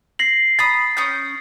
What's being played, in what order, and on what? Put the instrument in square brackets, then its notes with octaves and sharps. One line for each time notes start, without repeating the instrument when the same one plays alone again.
[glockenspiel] A#6 C7 F#7
[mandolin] A#5 B5 D#6 [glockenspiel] A6
[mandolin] C#4 D#6 G6